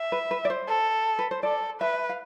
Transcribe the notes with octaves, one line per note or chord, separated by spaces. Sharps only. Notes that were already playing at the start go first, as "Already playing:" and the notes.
Already playing: E5
B4
B4
D5
C5
A4
B4
C5
A4 D5
B4 E5
F5